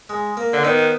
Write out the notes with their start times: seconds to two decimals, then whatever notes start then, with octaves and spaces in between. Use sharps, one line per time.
0.09 G#3
0.37 A#3
0.53 D3
0.64 D#3 B3